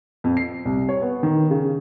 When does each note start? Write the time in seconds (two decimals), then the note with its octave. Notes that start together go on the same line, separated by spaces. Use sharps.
0.24 F2
0.37 C7
0.65 C2
0.89 C#5
1.02 B3
1.23 D#3
1.51 C#3